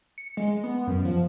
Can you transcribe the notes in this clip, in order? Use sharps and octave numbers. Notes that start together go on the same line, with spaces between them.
C#7
G#3
B3
F#2
F3